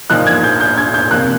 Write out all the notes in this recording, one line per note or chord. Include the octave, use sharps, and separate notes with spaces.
A#2 F3 A#3 D#4 F#6
G#6
G6
G6
G#6
G6
C3 F3 A#3 F#6